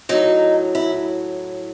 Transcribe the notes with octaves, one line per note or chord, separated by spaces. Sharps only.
A2 F#3 D#4
E4